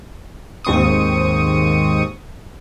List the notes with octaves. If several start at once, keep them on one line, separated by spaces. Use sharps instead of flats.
D#2 G#2 C4 C#6 D#6